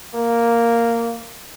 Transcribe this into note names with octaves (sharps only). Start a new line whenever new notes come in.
A#3